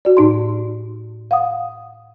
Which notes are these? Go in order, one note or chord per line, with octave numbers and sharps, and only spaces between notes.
F#4 D5
A2 D#4 C6
F5 F#5 D#6